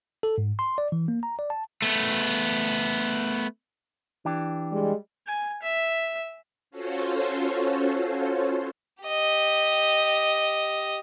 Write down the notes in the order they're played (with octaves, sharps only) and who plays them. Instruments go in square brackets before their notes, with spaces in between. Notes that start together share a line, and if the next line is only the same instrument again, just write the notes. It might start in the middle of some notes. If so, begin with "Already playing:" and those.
[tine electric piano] A4
G#2
C6
D5
E3
A#3
A#5
D5
A5
[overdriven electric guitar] A3 B3
[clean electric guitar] E3 D4 G4
[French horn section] G3 G#3
[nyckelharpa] G#5
E5
[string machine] C#4 F4 F#4 A4 C5 C#5
[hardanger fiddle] G4 D#5